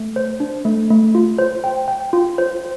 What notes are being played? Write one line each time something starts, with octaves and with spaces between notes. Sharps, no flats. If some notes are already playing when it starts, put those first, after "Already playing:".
Already playing: A3
C5
D4
A3
A3
F4
C5
G5
G5
F4
C5